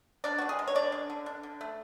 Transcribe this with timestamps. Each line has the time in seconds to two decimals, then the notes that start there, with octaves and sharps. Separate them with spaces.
0.24 D4 D5
0.38 D3 F#4
0.49 G#4
0.59 G#3
0.67 C#5
0.75 D3 D5
0.92 D4
1.10 D3
1.26 D4
1.43 D3
1.61 A3